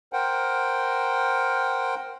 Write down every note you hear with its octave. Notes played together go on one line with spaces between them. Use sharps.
A#4 C5 F#5 G5